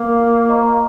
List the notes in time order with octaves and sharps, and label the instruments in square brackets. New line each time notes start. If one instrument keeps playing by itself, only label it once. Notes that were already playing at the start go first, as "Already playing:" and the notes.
Already playing: [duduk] A#3
[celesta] F4
C5 D#5 A#5 C#6